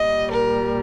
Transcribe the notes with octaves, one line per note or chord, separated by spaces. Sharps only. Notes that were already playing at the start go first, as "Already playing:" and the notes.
Already playing: A#2 G3 D#5
A#4